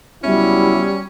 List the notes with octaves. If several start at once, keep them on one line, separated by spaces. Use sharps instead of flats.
C#2 F#3 G3 B3 C#4 E4